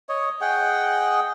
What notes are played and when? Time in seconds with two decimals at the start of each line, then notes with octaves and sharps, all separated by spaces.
0.09 C#5 D#5
0.41 G#4 D#5 F#5 G5